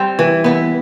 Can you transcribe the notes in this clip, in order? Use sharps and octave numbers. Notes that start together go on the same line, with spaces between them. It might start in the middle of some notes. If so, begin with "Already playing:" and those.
Already playing: G3 C4
E3
B3 E4